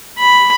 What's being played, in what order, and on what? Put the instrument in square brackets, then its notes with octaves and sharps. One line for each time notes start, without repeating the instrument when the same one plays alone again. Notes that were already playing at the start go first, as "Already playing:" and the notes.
[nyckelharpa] B5